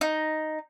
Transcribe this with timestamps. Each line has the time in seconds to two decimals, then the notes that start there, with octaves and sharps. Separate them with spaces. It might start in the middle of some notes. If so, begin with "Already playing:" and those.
0.01 D#4